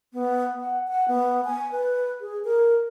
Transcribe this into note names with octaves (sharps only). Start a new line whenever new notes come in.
B3
F#5
F#5
B3
G#5
B4
G#4
A#4